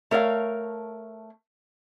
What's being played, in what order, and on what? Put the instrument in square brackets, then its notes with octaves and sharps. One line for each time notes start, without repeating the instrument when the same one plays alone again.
[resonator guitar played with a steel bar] A3 A#4 C#5 D5 F5